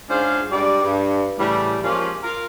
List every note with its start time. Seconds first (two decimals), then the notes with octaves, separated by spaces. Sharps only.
0.09 G#2 C#4 D4 F4 C5 F5
0.51 G2 G3 G#3 D5
0.84 G2
1.38 A2 C#3 E3 G3
1.83 F3 G#3 A#3 C#4 F4 G4
2.23 F4 A#4